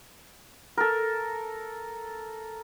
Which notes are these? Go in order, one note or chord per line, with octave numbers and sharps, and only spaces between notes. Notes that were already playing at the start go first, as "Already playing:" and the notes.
A4 A#4